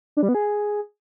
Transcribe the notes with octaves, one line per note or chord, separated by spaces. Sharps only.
D4
G3
B3
G#4